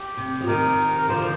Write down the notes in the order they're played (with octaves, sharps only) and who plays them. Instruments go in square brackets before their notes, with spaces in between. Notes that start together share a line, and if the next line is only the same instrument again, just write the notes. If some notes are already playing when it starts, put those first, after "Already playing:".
Already playing: [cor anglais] G4
[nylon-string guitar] C3
F3
[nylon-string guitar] C3 D#3 [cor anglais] A#4
[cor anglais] A#4
[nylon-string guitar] D3 F3 [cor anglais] C5